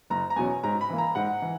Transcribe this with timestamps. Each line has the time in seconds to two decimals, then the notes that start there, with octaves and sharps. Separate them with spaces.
0.10 F#1 A#5
0.30 A#5
0.36 E2 B2 F#3 C#4 G#5
0.63 G#2 A#5
0.81 B5
0.90 E3 A#3
0.98 A#5
1.15 G#2 F#5
1.42 E3